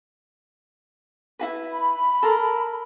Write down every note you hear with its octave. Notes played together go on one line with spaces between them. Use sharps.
E4 F#4 B4
B5
A4 A#4 C6